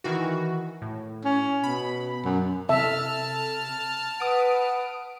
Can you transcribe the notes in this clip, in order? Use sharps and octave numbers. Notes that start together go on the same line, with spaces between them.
D#3 E3 F#4
A2
C#4
B2 B5
F#2
C3 A4 E5 A5 F6
B4 F#5 D#6 D7